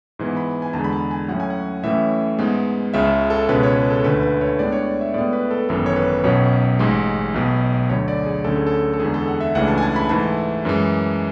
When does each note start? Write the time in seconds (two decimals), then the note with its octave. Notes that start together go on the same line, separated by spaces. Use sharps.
0.19 G#2 E3 B3
0.37 B5
0.62 G#5
0.73 E2 D3 G#3 A5
0.84 B5
0.93 A5
1.11 G#5
1.28 A2 F#3 C#4 F#5
1.40 G#5
1.50 F#5
1.83 A2 E3 A3 C#4 E5
2.39 G#2 G#3 B3
2.93 C#2 C#3 G#3 E5
3.30 A4
3.49 C#2 B2 G#3 C#4 B4
3.63 C#5
3.76 B4
3.90 A4
4.04 D2 D3 A3 B4
4.23 B4
4.41 C#5
4.59 A2 G#3 B3 D4 D5
4.72 C#5
4.86 D5
5.01 E5
5.14 A2 G#3 B3 D5
5.33 B4
5.51 A4
5.69 G#1 F#2 E3 B3 A4
5.86 C#5
5.96 B4
6.24 B1 B2 F#3 C#4 C#5
6.79 A1 G#2 G#3
7.34 B1 B2 F#3
7.89 D2 D3 F#3 C#5
8.08 D5
8.26 G#4
8.44 D2 D3 F#3 C#4 A4
8.56 G#4
8.66 A4
8.94 A4
9.00 E2 D3 G#3 G#4
9.14 A4
9.28 F#5
9.40 E5
9.55 C#2 C#3 E3 A3 D4 F#5
9.68 A5
9.78 G#5
9.82 A5
9.96 B5
10.09 G#2 E3 A3 A5
10.65 F#2 E3 G#3